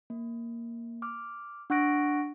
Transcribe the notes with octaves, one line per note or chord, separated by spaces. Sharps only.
A#3
D6 F6
D4 F#5 C#6 F#6 A#6 D7